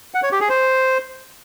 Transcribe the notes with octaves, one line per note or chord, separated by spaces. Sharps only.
F#5
C#5
G4
G#4
C5